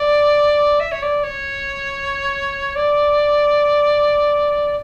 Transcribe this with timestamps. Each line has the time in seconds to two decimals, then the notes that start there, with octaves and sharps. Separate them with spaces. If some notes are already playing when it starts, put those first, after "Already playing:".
Already playing: D5
0.80 E5
0.92 C#5
1.02 D5
1.24 C#5
2.75 D5